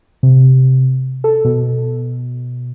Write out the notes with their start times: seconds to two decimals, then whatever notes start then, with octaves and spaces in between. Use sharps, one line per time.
0.23 C3
1.24 A4
1.45 B2